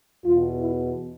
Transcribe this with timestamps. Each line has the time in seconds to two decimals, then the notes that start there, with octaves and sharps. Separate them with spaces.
0.25 E2 B2 F4
0.59 E4